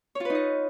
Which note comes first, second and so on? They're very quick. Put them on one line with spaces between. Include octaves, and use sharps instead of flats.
C#5 F4 B4 D#4 D#5